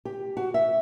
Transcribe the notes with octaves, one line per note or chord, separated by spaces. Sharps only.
G4
F#4
E5